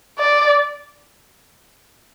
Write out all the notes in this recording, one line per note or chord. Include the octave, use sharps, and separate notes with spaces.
D5